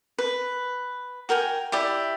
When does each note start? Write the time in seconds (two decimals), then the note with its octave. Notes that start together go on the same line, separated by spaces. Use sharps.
0.18 B4
1.29 F#4 A#4 G5 G#5
1.72 E4 G4 D5 E5